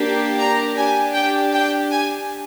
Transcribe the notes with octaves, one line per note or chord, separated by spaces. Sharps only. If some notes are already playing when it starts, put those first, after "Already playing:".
Already playing: A#3 D4 G4
A#5
D4 G4 G#5
G5
G5
G#5